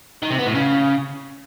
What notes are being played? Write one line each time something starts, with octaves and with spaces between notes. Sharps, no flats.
D#3
C3
B3
A2
C#3